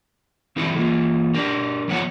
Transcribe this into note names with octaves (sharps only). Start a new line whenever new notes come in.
E3 C4 E4 G#4 A4
E3 A#3 F4
D4 G4 A#4
F3 B3 C4 C#5 F#5